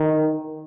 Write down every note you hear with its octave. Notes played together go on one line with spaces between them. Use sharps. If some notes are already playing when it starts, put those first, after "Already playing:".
Already playing: D#3